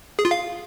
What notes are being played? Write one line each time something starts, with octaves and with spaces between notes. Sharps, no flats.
G#4
F4
F5